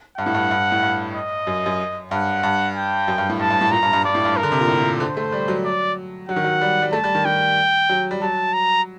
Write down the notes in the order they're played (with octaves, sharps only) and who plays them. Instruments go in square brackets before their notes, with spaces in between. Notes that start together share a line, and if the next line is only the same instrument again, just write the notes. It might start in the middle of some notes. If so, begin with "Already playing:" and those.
[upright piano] G2 [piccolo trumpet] F#5
[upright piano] A2
G2
G2
A2
G2
[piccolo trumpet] D#5
[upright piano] F#2
F#2
[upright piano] G2 [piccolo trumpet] F#5
[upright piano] G2
[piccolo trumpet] G5
[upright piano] F#2
G2
A2
[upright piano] G2 [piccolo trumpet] A5
[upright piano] G2
A2
[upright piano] A#2 [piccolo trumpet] A#5
[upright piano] G2
G2
[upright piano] G2 [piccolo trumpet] D5
[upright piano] A2
G2
[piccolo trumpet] A#4
[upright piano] D3
C3
A#2
A2
A#2
[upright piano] D3 [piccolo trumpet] C5
[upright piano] A3
G3
F#3
[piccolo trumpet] D5
[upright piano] F#3 [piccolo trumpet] F#5
[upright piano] D#3
F#3
G3
G3
[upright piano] A3 [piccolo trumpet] A5
[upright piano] G3
D#3
[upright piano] D#3 [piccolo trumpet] G5
[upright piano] F#3
G3
[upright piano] F#3 [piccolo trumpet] A5
[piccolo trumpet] A#5